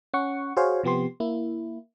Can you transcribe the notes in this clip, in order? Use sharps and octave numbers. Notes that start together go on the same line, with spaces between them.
C#4 F#5 C#6
F#4 G#4 C5 C#5 F5
C3 F3 B3 G4 C6
A#3 E4